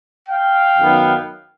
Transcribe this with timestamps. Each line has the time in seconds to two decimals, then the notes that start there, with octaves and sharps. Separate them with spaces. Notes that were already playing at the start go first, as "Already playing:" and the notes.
0.28 F5 G5
0.78 F#2 D#3 F#3 B3